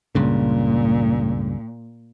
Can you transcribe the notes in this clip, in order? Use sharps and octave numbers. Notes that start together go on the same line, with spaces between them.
C#2 G2 A#2 C#3